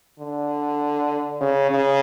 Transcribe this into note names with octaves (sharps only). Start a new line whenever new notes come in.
D3
C#3
C#3